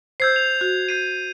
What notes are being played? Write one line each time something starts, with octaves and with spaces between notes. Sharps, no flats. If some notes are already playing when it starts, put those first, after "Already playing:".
C5 E6 G6 G#6 C7
F7
F#4
G6 C7 D#7